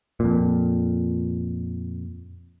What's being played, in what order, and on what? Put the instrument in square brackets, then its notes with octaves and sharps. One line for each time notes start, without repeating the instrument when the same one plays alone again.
[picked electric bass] F2 A#2